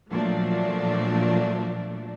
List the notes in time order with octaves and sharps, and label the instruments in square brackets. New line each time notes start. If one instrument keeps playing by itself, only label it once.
[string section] A#2 F3 F#3 A3 D4